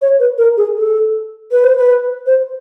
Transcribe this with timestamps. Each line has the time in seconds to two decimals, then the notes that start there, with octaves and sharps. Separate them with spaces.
0.02 C#5
0.19 B4
0.38 A#4
0.57 G#4
0.76 A4
1.52 B4
1.64 C5
1.77 B4
2.26 C5